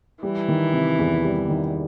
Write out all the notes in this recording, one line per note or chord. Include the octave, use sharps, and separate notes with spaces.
E3 G3
D#3
C3
E2
G3
D#3